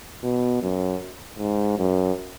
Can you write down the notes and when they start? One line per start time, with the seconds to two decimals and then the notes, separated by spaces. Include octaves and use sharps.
0.24 B2
0.62 F#2
1.39 G#2
1.77 F#2